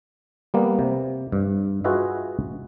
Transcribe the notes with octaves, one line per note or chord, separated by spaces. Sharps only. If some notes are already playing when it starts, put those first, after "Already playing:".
G3 A#3 B3
C3
G2
F4 F#4 G#4 B4 D#5 E5